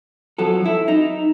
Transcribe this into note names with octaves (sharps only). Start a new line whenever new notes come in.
F3 F#3 A4
E4
D#4